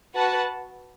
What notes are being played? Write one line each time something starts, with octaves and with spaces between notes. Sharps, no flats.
F#4 B4 F#5 A5